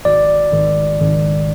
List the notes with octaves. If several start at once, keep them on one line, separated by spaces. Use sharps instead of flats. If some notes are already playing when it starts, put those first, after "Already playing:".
G#1 D5
G#1
G#1